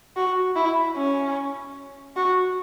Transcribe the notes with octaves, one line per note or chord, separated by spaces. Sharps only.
F#4
E4
C#4
F#4